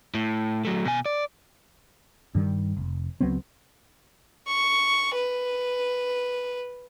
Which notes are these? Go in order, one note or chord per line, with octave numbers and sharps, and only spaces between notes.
A2
F#3 A3
B2 G#5
D5
G2 D#3 G3
F1
C#2 F#3 B3 C4
C#6
B4